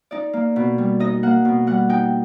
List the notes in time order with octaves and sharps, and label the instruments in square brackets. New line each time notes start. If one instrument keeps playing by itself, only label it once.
[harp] D#4 D5
A#3
B2
G3
D#4 D#5
A#3 F#5
B2
G3 F#5
D#4 G5